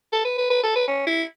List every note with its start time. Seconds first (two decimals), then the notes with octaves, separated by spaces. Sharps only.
0.12 A4
0.25 B4
0.38 B4
0.50 B4
0.63 A4
0.76 B4
0.88 C#4
1.07 E4